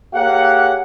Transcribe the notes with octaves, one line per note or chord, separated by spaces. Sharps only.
A#3 G4 G#4 C#5 F5 F#5